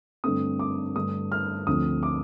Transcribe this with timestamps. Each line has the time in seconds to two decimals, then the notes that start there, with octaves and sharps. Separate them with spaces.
0.24 G2 D3 A3 C4 D#6
0.59 D6
0.95 G2 D3 A3 D#6
1.32 F6
1.67 D2 D3 F3 C4 D#6
2.03 D6